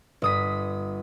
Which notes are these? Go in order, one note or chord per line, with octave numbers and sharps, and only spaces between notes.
G1 D#6 B6